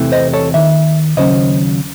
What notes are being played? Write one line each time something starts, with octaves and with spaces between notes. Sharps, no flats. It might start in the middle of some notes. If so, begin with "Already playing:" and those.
Already playing: E2 C3 E3 A3
C5 D#5
A4 C#5
D#2 D#3 E5
D#2 C#3 F#3 C#4 C5 D#5